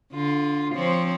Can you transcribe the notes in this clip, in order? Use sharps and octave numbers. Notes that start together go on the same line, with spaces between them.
D3 F4
F3 C4 C#5